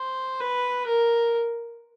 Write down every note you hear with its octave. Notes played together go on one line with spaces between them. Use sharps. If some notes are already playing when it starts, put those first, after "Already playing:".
Already playing: C5
B4
A#4